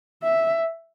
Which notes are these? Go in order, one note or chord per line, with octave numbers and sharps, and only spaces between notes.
E5